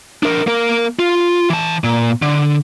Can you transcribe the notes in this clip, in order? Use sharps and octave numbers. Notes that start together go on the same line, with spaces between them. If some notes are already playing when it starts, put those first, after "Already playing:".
D4 A#4
A#3 A#4
F4
E3 A5
A#2
D3